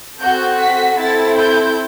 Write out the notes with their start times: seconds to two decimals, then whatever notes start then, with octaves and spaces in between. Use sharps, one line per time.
0.20 C4 F#4 A4 G6
0.59 B6
0.98 C4 E4 A4 A6
1.37 G6